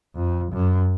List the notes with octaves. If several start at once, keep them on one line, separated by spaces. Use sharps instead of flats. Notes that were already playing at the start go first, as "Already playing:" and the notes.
F2
F#2